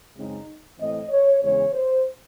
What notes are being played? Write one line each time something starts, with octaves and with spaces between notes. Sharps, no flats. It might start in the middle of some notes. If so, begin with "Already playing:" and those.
F#2 C#3 G#3 C4 D#4
A2 E3 C4 D#5
C#5
E2 C#3 G#3 C#4 C#5
C5